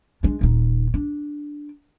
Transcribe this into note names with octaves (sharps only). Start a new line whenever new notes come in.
G#3 D4
D#1 D#4
D4